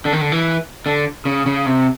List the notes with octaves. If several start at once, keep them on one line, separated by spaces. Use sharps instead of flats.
D3
D#3
D3
E3
D3
C#3
C#3
C3